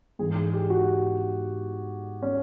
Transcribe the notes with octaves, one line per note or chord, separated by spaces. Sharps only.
G#2 E3 G#4
G#4
G4
F#4
C#4